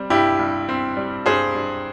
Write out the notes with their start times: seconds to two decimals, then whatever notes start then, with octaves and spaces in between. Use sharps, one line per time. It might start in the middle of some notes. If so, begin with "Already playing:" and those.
Already playing: G3 C4
0.10 G2 E4 G4
0.39 G2
0.69 C4
0.97 G3
1.26 G2 G#4 C5
1.55 G2